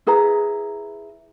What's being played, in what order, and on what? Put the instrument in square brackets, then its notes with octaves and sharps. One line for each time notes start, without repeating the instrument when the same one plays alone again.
[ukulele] E4 G#4 B4 A#5